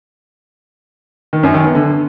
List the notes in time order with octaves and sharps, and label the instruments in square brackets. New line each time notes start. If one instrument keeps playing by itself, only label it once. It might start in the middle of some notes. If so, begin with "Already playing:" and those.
[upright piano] D#3
F#2
D#3
B3
D3